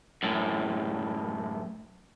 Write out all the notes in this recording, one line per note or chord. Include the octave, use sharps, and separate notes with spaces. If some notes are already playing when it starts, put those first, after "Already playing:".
F#2 A2